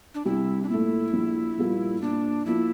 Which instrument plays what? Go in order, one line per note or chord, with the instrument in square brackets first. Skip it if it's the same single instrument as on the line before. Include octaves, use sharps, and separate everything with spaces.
[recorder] D4
[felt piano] C2 [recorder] E4
[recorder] D4
[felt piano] A#2 A3 [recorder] E4
[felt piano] A#1
A#2 G3 A#3 F4
[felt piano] A#2 [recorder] D4
[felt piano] F3 A#3 F4 [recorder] E4